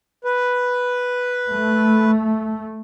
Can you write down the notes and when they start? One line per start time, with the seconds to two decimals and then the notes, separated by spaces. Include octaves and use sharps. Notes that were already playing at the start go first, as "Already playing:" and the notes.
0.24 B4
1.51 A3